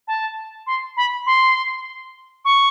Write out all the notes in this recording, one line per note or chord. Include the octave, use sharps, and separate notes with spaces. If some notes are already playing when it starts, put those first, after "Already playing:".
A5
C6
B5
C6
C#6